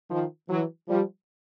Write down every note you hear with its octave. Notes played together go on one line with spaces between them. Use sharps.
D#3 F3
E3 F#3
F3 G3